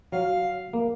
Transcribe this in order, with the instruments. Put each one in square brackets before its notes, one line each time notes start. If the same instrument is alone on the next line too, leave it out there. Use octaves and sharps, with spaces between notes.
[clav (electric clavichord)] F#3 [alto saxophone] F5
[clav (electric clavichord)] A#3